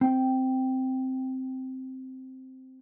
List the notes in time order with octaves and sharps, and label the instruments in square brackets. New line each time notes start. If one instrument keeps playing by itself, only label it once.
[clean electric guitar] C4 G5